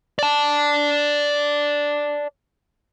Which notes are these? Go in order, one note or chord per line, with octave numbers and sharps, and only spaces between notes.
D5 A5